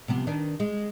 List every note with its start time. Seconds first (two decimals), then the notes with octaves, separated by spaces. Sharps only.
0.08 C3 F3 B3
0.27 D#3 D4 B4
0.60 G#3